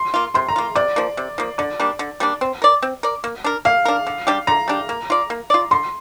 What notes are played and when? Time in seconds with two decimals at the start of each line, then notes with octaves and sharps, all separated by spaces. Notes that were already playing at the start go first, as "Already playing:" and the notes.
Already playing: C6
0.14 A#3 F4
0.34 C3 C6
0.48 A#5
0.56 A#3 F4
0.76 C3 D5
0.96 F3 A#3
1.17 C3
1.38 F3 A#3
1.58 D3 D5
1.80 G3 A#3 D4
1.99 D3
2.20 G3 A#3 D4
2.41 C4
2.62 A#4 D5
2.82 C4
3.03 A#4 D5
3.24 A#3
3.44 D4 A#4
3.65 A#3 F5
3.85 D4 A#4
4.07 D3
4.27 G3 D4 G4
4.47 D3 A#5
4.68 G3 D4 G4
4.89 A#3
5.10 F4 D5
5.30 A#3
5.50 F4 D5
5.71 D3 C6